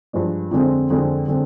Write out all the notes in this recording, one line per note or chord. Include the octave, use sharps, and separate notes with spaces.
G2 F3 G#3 D4
F2 D3 G#3 C4
F2 D3 G#3 C4
D3 G#3 C4